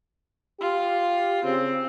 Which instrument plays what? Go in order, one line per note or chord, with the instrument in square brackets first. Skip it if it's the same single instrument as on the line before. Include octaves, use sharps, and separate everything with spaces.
[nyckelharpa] F4 [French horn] G4
[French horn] C#3 [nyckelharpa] C4